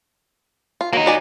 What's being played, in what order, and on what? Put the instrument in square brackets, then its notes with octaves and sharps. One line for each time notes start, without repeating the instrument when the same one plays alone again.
[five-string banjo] F4
[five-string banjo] F#3 [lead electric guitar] A#3 D#4
[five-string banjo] F#3 D5 G#5